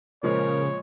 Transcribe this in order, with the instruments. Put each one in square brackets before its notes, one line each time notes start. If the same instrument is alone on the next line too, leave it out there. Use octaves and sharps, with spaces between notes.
[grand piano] A#2 F3 G#3 [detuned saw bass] C#3 [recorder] A#4 [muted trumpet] C#5